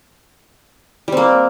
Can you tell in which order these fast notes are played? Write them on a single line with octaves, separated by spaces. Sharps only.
G3 C4 A#3